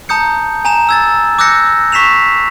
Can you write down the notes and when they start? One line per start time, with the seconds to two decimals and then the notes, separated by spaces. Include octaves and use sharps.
0.09 A5 A#5 D#6 G6 C#7
0.65 G#5 A#5 E7
0.89 E6 G#6 A6
1.39 D6 E6 F#6 G6 A#6 C#7
1.92 C#6 B6 C7 E7 F7